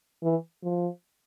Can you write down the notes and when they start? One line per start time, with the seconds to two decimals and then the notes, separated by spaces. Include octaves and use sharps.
0.23 E3
0.63 F3